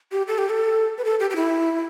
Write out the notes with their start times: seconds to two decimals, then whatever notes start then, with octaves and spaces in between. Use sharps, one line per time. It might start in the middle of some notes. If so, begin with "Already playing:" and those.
0.12 G4
0.28 A4
0.38 G4
0.50 A4
0.98 B4
1.05 A4
1.20 G4
1.30 G4
1.36 E4